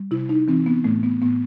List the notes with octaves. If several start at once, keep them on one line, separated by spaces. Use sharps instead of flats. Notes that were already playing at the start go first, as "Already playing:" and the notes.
Already playing: G3
C3 E4
D#4
E3 C4
B3
A2 A3
B3
A2 B3